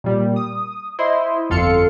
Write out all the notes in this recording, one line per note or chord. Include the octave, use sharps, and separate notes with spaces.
A#2 G3
D#6
E4 C5 D#5 C6
G1 F2 A4 F5 C6 C#7